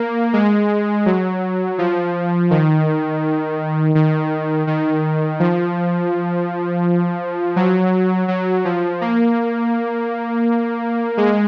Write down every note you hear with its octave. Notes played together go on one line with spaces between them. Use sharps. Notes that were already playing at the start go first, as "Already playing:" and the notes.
Already playing: A#3
G#3
F#3
F3
D#3
D#3
D#3
F3
F#3
F#3
F3
A#3
G#3